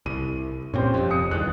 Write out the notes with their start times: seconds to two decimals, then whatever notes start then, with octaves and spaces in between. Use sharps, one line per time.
0.06 C2 D#7
0.74 G2 A#2 C4 C#4 G4 C5
0.94 F1 F2
1.11 D#6 C#7
1.31 E2 G2 D#3 F#6